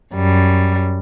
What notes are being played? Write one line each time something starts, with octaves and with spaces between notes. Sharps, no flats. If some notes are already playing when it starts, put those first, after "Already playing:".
F#2 G3